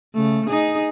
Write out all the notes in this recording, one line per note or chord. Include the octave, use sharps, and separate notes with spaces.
C#3 A3
D#4 G#4